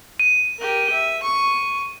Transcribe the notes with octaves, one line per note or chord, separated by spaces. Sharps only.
D#7
G4 A#4
E5
C#6